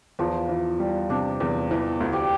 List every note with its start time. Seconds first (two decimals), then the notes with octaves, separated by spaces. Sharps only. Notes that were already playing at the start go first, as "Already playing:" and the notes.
0.19 E2 F3
0.49 E3
0.80 G3
1.10 C3 D4
1.40 E2
1.71 E3
2.00 D2
2.13 G4